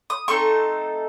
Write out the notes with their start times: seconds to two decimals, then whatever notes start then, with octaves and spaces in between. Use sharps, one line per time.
0.10 D#6
0.28 A3 C4 D#4 A4 C#6